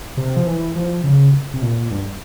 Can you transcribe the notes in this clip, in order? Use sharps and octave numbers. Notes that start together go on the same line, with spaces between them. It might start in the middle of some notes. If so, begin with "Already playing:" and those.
C3
F3
E3
F3
C#3
C3
A#2
G2